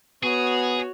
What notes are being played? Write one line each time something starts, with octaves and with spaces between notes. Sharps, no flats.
B3 F#4 G#4 C#5